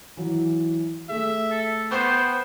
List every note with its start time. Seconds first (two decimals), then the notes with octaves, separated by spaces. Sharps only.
0.17 E3 F#3
1.09 A3 G#4 E5
1.51 A4
1.91 B3 C5 G5 C#6